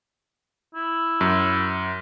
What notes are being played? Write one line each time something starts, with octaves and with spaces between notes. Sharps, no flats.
E4
F#2